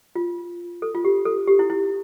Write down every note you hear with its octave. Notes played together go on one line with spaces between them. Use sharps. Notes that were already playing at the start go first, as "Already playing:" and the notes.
F4
A4
F4
G4
A4
G4
E4
E4